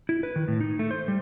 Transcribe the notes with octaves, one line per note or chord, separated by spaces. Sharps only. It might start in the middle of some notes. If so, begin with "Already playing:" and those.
E4
B4
D#3
A2
D#4
A3
C5
G3